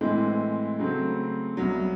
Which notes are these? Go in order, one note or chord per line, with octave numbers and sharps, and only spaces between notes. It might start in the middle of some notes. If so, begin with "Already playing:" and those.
A2 E3 G#3 C4
C#3 F#3 A3 C4
C2 B2 F#3